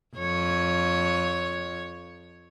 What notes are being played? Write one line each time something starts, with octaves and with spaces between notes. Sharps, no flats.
F2 C#5